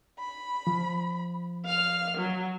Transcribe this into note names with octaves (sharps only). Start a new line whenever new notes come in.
B5
F3
F5 F6
F#3